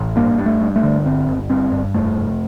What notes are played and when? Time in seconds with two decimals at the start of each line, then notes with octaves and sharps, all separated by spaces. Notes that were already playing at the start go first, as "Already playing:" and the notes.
Already playing: A1
0.16 G2 A#3
0.38 G2
0.46 A3
0.61 G2
0.76 A3
0.83 D3
1.05 G1 C4
1.28 G1
1.49 G2 C4
1.72 G2
1.94 F1 A3
2.16 F1